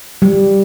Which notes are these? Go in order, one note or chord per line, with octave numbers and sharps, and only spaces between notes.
G3